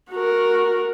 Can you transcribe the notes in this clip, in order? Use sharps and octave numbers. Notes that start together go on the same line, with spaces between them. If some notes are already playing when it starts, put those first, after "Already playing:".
F#4 A#4